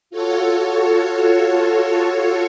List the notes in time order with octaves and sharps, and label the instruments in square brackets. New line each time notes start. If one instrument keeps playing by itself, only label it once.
[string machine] F4 F#4 A4 C#5